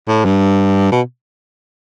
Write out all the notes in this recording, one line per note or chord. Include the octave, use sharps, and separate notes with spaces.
A2
G2
B2